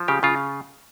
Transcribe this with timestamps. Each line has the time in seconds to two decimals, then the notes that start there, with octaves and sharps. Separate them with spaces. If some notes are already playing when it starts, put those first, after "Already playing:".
Already playing: F3
0.08 C#3 G4
0.23 C#3 F4